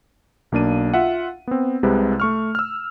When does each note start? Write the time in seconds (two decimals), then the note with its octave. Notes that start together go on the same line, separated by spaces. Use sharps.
0.52 B1 A#3 D4 D#7
0.94 F4 E5 F#5
1.47 B3 C4
1.83 C2 C3 G#3 B4
2.20 A3 C#6 F6
2.55 E6 F6